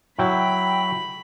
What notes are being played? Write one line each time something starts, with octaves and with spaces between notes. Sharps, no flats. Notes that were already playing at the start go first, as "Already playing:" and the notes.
F#3 E4 G5 B5